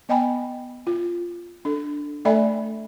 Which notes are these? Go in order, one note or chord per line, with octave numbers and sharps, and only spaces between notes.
B3 D#5 G5 G#5 B5
F4
D4 A4
A3 A4 D5 E5 G#5 B5